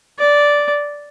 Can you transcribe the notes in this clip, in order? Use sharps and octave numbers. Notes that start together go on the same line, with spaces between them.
D5